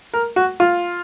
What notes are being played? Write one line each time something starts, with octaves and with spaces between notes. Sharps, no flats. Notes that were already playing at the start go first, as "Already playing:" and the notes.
A#4
F#4
F4